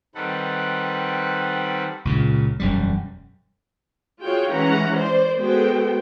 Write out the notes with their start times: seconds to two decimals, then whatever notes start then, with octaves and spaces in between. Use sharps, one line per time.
0.15 D#3 G3 C4 A4 B4 F#5
2.05 C#2 A#2 C#3
2.60 E1 F#2 G3
4.22 F4 F#4 G#4 C#5 G5
4.54 E3 G#3 C#4 F#5 A#5
4.97 C5 D5
5.38 G#3 B3 F#4 A4 C5 G5